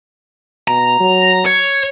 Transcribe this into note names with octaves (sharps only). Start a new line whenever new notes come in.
B2 A#5
F#3
C#5